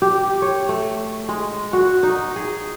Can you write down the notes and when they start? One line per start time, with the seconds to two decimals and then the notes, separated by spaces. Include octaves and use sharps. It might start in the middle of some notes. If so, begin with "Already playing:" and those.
0.02 G4
0.42 C#5
0.69 A3
1.29 G#3
1.73 F#4
2.03 D#4
2.36 G#4